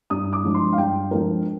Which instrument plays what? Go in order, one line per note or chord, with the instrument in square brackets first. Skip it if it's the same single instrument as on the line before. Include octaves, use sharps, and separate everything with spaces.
[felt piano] G2 D#6
D6
F3 G#3 D4
C6
F5
G2 G5
F3 G#3 D4 A#4